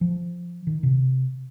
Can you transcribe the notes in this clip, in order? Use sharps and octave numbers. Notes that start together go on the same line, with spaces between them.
F3
D#3
C3